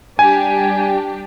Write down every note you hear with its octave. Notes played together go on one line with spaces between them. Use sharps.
G3 D4 G4 G#5